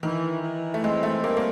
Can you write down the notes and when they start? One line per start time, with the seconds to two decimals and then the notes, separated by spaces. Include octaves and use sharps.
0.03 D#3 E3
0.43 E3
0.74 A3
0.83 G#3 C4
1.03 A3
1.23 G3 A#3
1.37 A#3